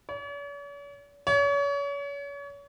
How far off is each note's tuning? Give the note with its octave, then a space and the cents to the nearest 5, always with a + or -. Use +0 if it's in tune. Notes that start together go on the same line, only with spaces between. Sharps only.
C#5 +45
C#5 +35